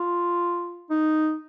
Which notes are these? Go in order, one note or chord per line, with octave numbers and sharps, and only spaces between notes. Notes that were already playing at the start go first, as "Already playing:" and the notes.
Already playing: F4
D#4